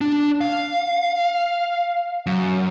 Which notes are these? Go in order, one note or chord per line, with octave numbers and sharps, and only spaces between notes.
D4
F5
F#2